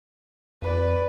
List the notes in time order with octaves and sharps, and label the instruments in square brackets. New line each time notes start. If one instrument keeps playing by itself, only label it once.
[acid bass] F2 [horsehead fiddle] B4 D5